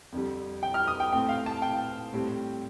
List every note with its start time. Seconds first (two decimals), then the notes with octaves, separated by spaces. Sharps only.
0.13 F2 D3 G3
0.63 G5
0.74 F6
0.87 D#6
1.00 G5
1.12 A2 A3 C4 G5
1.29 F5
1.46 A5
1.62 G5
2.13 A2 G3 C4